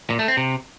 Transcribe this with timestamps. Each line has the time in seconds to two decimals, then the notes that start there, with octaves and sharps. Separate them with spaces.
0.10 A#2
0.19 A3
0.28 C4
0.37 C3